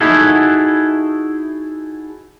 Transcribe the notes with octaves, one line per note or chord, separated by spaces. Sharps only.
D#4 E4 F#4 G#4 A4